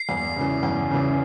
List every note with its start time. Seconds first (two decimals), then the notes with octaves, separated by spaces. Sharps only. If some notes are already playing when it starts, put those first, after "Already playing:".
Already playing: C7
0.09 E2
0.36 C#3 E3
0.63 E2
0.90 C#3 E3